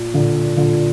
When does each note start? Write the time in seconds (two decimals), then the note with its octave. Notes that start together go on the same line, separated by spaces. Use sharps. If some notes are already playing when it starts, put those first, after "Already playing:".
Already playing: A#2
0.14 A#2 D3
0.57 A#2 D3